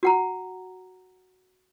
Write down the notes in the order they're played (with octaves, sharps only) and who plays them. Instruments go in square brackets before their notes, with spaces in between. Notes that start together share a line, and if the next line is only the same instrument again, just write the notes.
[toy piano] F#4 F#5 A#5